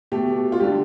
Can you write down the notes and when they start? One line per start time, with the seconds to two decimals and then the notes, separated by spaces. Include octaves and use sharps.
0.12 B2 A3 G4
0.52 F4
0.60 D3 G3 G4